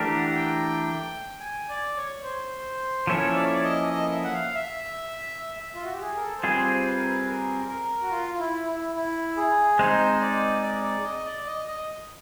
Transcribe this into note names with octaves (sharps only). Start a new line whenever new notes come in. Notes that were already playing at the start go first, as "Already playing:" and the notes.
Already playing: E3 A3 D4 G4 A#4
F#5
F#5
G5
G#5
D5
C#5
C5
F3 A#3 C#4 E4 A4 C#5
D5
C#5
D5
D#5
D#5
E5
F#5
F5
E5
E5
F4
F#4
G4
G#4
A#4
A4
C5
G3 C4 F4 G#4 B4
C5
B4
A#4
B4
A#4
A#4
F#4
F4
F4
E4
E4
E4
G#4
G#3 C4 D#4 C5
D5
D5
D5
D#5
D5
D#5
D#5